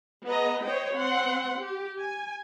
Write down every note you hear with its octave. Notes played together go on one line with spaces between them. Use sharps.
B3 G#4 D#5 A#5
C5 C#5 D#5 G5
C4 F#5 C6
G4
G#5